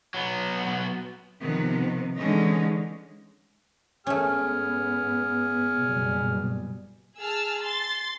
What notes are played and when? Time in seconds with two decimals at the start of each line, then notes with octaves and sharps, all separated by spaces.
0.14 F#3 B3
1.41 C3 D#3 F3 B3
2.17 D3 E3 G#3 C#4 D#4
4.07 G#2 A3 B3 C#4 G#4 F6
5.80 F#1 B2 G3
7.18 G#4 A5 E6 F6
7.60 C6 A6